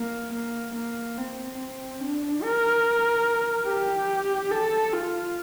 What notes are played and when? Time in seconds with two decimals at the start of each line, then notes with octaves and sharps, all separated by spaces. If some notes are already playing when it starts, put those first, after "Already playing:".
Already playing: A#3
0.33 A#3
0.75 A#3
1.17 C4
1.58 C4
2.00 D4
2.43 A#4
3.67 G4
4.51 A4
4.93 F4